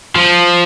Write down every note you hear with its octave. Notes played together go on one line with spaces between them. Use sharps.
F3